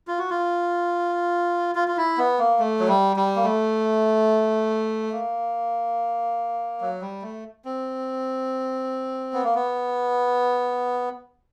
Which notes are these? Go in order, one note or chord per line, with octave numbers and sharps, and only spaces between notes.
F4
F#4
F4
F4
F4
E4
B3
A#3
A3
F#3
G3
G3
A#3
A3
A#3
F#3
G3
A3
C4
B3
A#3
B3